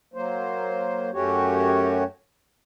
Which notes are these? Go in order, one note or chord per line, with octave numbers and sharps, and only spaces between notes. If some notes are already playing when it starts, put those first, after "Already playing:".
F#3 A#3 C5
F#2 A3 C#4 F#4 G4 C#5